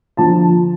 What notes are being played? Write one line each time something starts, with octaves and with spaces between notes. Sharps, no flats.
D3 F3 A5